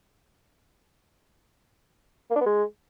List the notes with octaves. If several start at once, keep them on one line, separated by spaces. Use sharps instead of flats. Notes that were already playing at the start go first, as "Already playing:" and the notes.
A#3
D4
B3
G#3